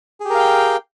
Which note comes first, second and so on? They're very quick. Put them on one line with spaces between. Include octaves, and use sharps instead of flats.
G#4 G4 A#4 F5 G5